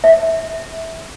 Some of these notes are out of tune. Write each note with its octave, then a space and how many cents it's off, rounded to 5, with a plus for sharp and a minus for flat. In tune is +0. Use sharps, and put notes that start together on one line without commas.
E5 -20